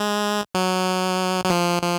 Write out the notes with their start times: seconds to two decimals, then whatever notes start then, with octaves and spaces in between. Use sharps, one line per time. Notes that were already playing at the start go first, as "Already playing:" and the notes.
Already playing: G#3
0.55 F#3
1.45 F#3
1.50 F3
1.83 F3